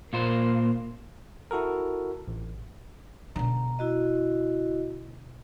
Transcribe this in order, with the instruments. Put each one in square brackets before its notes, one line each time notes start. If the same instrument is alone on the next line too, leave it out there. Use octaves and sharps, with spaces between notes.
[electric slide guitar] A#2 F4 C5 [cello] A#3
[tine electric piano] E4 F#4 A4 A#4
A1
[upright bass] B2 D3 [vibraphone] A#5
[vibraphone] E4 F#4 D#5